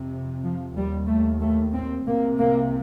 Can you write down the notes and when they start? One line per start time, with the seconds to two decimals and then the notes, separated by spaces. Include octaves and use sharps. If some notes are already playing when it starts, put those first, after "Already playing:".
Already playing: F2 C3
0.43 F3
0.75 D#2 G3
1.07 A3
1.41 A3
1.74 C4
2.06 C2 C3 A#3
2.39 A#3